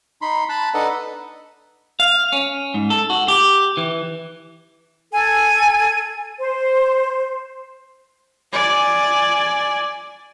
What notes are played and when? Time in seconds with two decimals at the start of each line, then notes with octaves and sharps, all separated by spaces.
0.22 D#4 B5 C6
0.49 A5 B5 F#6
0.74 D4 D#4 A4 B4 D#5 F#5
2.00 F5
2.32 C#4
2.74 G#2
2.90 A4
3.10 F#4
3.28 G4
3.77 E3
5.11 A4 G#5
6.38 C5
8.53 D5 G#5